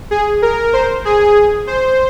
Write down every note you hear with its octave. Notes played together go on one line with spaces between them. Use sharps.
G#4
A#4
C5
G#4
C5